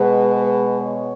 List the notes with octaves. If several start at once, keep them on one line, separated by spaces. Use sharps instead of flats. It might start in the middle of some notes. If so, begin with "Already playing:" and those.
Already playing: B2 G#3 B4
B4
C#5